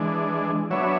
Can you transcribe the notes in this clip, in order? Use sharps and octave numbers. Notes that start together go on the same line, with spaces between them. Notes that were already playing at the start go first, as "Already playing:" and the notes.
Already playing: E3 G#3 D4
F#3 B3 D4 C#5 E5